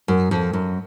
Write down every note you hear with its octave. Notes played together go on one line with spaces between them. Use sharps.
F#2
F2
F#2